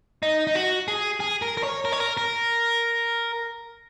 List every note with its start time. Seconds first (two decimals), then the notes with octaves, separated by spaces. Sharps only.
0.23 D#4
0.47 D#4
0.55 F#4
0.88 G#4
1.20 G#4
1.42 A#4
1.57 A#4
1.63 C#5
1.85 A#4
1.92 C#5
2.00 A#4
2.17 A#4